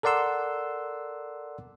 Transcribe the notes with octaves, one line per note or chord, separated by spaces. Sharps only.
A4 A#4 D5 F#5 C6 E6